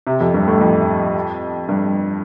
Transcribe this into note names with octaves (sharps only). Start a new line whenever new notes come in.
C3
F2
G2
A2
F2
G2